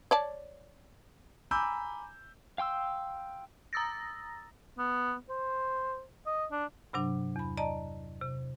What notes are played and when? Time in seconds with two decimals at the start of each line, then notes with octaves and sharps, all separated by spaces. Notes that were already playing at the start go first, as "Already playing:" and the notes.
0.11 C#5 D5 A5
1.51 G#5 A#5 B5 D6 E6 G6
2.58 F5 G5 C6 E6
3.73 A#5 D#6 E6 A6 A#6
4.78 B3
5.29 C5
6.27 D#5
6.51 D4
6.93 G2 C3 F#3 D4
7.36 E2 B5
7.57 D5 D#5 A5 A#5
8.22 C3